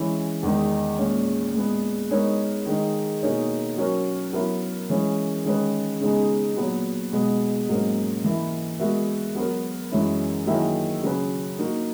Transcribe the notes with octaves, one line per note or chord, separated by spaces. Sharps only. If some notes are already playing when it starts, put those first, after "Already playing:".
Already playing: E3 G#3 C#4 E4
E2 D#3 G#3 D#4
A#2 G#3 C#4
A#2 G#3 B3
G#3 B3 D#4 A#4 C#5
D#3 G#3 D#4
B2 A#3 D#4 G#4 C#5
F#3 C#4 F#4 A#4
F#3 B3 E4 A#4
E3 G#3 C#4
D#3 G#3 C#4 G#4 B4
C#3 G#3 B3 D#4 G#4
A#2 F#3 B3
B2 G#3 B3
G#2 F#3 A#3 C#4
E3 A#3 E4
G#3 B3 F#4 A#4 E5
F#3 B3 F#4 A#4
F#2 E3 G#3 C#4 E4
D#3 F#3 A#3 E4 G#4
C#3 F#3 C#4 G#4 B4
A#3 D#4 F#4